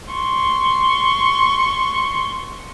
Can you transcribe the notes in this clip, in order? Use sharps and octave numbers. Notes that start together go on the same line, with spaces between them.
C6 C#6